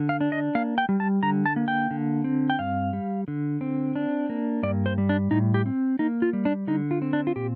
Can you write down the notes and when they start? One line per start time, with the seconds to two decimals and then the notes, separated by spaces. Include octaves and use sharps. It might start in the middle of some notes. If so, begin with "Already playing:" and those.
Already playing: D3
0.09 F5
0.21 D4
0.32 D#5
0.55 A#3 F5
0.78 G5
0.89 G3
1.00 A5
1.23 D3 A#5
1.46 A5
1.56 A#3
1.68 G5
1.91 D3
2.24 C4
2.50 G5
2.59 G2 F5
2.93 G3
3.28 D3
3.61 C4
3.96 D4
4.29 A#3
4.63 G2 D5
4.86 C5
4.98 G3
5.09 D4
5.31 A2 D#4
5.54 G4
5.66 C4
5.99 A#3 D#4
6.22 F4
6.33 G3
6.45 D4
6.67 D3 D#4
6.91 F4
7.02 C4
7.13 D4
7.27 F4
7.36 A#2 G4